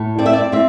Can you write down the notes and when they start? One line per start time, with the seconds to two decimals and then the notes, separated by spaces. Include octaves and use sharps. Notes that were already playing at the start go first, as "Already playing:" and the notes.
Already playing: A2
0.18 C4 D5
0.26 E5
0.33 D5
0.52 C4 E5